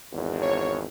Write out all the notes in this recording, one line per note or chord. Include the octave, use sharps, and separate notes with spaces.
G#1 E2
C#5